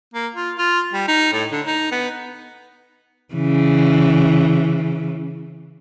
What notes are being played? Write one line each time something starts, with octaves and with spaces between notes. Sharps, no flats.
A#3
F4
F4
G3
D#4
A2
D3
D#4
B3
C#3 E3